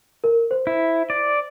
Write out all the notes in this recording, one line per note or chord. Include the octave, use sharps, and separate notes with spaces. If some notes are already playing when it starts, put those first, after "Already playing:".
A#4
C5
E4
D5